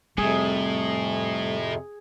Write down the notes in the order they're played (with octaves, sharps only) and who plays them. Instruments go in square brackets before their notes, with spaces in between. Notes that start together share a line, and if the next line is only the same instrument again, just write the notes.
[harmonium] F2 C3 [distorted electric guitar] A2 [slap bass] G3 A3 [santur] G#4